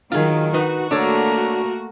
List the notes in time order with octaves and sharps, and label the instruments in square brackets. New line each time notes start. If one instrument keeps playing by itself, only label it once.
[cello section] D#3 F#3 [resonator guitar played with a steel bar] F4 G#4
[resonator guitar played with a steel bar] D#4 B4 [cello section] F#4
[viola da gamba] A3 A#3 A#4 [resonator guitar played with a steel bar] D4 A4 C#5